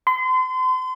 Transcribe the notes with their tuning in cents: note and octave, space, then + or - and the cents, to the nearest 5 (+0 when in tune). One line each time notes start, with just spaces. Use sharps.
C6 -35